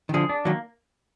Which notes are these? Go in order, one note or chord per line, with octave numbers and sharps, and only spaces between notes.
D#3
D3 F3 G#4
D4
D#3 F#3 A#3